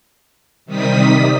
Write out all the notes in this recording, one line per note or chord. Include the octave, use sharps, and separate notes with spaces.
C3 D#3 G3 D#6 B6